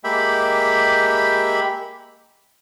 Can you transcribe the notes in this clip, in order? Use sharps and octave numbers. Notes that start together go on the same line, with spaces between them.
G#3 A#3 G4 E5 G5 B5